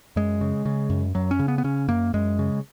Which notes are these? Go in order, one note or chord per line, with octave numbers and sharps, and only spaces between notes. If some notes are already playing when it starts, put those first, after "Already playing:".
F#2 G#3
C#3
C#3
F#2
F#2 F#3
C#4
C#3
B3
B3
C#3 C#4
F#2 A#3
F#2 G#3
C#3